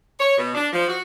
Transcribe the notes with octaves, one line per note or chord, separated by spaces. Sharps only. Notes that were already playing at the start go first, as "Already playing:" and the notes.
C#5
B2
D4
F3
F#4